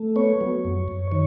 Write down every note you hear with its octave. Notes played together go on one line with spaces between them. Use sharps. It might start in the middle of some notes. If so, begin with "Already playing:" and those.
Already playing: A3
B3 C#5
F#3
F#2
F#2
D#3 C#5